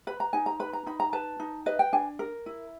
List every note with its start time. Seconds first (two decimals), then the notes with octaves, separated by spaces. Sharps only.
0.07 B4 B5
0.20 A#5
0.33 D#4 G#5
0.46 A#5
0.60 B4 B5
0.73 A#5
0.86 D#4 B5
1.00 A#5
1.13 B4 A5
1.40 D#4
1.66 B4 D#5
1.79 G5
1.93 D4 G#5
2.19 A#4
2.46 E4